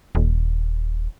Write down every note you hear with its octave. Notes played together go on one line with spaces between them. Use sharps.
D#1